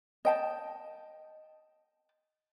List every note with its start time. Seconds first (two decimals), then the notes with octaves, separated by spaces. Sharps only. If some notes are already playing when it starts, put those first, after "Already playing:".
0.25 D#5 G5 A5